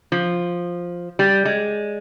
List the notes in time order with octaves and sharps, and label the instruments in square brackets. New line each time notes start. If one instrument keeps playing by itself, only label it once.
[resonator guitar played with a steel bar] F3
G3
G#3